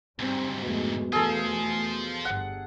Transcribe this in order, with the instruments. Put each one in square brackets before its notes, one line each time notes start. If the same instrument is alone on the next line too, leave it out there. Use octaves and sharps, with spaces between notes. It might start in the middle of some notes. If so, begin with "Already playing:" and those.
[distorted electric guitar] D2 G#2 [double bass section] G3 C4
[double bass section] F2 G#3 A3 [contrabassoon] B2
[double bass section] E2 E3 A3 [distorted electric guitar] F4 C5 [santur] G#4 A4
[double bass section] G1 G2 [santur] F#5